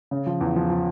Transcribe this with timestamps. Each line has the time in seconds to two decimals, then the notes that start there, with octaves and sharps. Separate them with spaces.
0.11 C#3
0.26 F3
0.41 E2
0.56 F3
0.70 F3